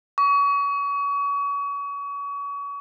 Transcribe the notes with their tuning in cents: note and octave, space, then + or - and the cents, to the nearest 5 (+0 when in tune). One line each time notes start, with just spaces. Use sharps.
C#6 +35